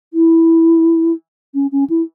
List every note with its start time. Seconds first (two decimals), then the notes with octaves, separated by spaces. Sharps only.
0.14 E4
1.54 C#4
1.72 C#4
1.90 E4